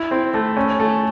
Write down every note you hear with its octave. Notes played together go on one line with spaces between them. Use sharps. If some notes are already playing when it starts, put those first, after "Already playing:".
Already playing: E4
C4
A3
C#4
A3